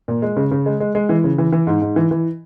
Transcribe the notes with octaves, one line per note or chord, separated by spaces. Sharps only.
A#2
G#3
C#3
C#3
G#3
G#3
G#3
E3
C#3
E3
E3
G#2
G#2
E3
E3